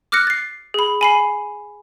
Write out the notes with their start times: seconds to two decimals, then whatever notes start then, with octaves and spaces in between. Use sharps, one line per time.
0.12 D6 F6 F#6 A#6 C#7
0.27 A6 C7
0.74 G#4 B5
1.01 G#5 B5 C7